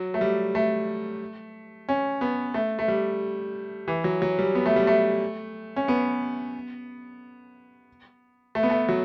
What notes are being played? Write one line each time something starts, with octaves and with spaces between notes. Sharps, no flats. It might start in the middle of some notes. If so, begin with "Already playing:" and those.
Already playing: F#3
A3
G3
A3
C#4
B3
A3
A3
G3
E3
F#3
F#3
G3
B3
A3
G3
A3
C#4
B3
A3
B3
A3
F#3